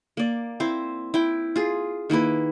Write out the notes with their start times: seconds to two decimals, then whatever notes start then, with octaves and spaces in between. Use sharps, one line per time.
0.17 A#3 D5
0.60 C4 E4 C5
1.14 E4 G5
1.56 F4 G#4
2.10 D#3 A#3 E4 B4